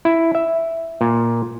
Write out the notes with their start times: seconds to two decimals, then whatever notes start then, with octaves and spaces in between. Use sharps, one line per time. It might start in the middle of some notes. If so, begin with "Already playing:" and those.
0.05 E4
0.35 E5
1.01 A#2